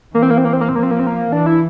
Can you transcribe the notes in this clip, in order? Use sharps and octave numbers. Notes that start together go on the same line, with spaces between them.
E3 A#3
C4
A#3
C4
A#3
C4
A#3
C4
F3 A#3
C4
A#3
C4
A#3
E3 D4
E4